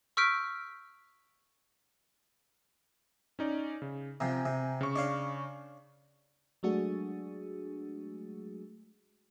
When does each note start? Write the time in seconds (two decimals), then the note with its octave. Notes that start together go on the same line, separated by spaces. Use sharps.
0.17 C#6 E6 F6 G6 B6 D7
3.39 C#4 D#4 D5
3.82 C#3
4.20 C3 F3 G5 G#5 A#5
4.45 C3
4.81 C#3 C#6
4.96 D4 C#5 F5
6.63 F#3 G#3 A3 D4 F#4 G#4